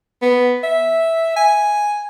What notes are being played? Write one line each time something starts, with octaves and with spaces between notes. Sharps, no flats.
B3
E5
G#5